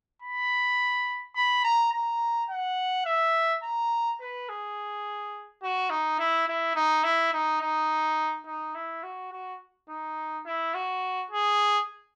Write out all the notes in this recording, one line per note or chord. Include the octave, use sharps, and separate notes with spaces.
B5
B5
A#5
A#5
F#5
E5
A#5
B4
G#4
F#4
D#4
E4
E4
D#4
E4
D#4
D#4
D#4
E4
F#4
F#4
D#4
E4
F#4
G#4